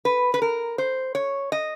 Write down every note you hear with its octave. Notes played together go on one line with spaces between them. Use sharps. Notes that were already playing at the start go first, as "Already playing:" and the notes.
B4
B4
A#4
C5
C#5
D#5